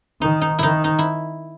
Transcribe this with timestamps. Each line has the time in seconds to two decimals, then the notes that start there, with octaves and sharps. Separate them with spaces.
0.22 D#3 D#4
0.42 D#4
0.59 D#3 D#4 E4
0.84 D#4
0.99 E4